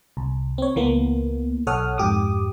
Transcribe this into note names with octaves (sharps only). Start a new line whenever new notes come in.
C2
C4 C#5
C#2 E3 A#3 B3
B1 A4 C#5 F#5 D#6 F6
F2 G#2 G4 D6 D#6